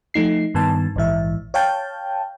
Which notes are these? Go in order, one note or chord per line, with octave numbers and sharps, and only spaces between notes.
F3 A3 D#4 C7
G2 D#3 B3 A5
A#1 G#2 E3 E5
C#5 F5 G5 A5 G6